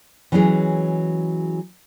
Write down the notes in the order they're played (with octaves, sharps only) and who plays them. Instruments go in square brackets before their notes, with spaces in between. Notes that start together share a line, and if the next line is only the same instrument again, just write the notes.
[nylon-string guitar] E3 F#3 G#3 C#4 G#4